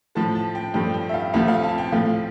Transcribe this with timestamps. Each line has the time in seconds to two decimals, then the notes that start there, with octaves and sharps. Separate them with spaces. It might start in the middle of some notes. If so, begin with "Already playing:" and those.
0.15 A2 F3 A3 A5
0.35 A5
0.55 G5
0.74 G2 F3 A3 G5
0.94 G5
1.09 E5
1.14 F5
1.33 D2 C3 F3 A3 F5
1.48 F5
1.63 A5
1.78 G5
1.92 A2 F3 A3 F5